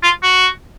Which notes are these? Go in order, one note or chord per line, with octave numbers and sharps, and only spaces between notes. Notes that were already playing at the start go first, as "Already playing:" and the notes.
F4
F#4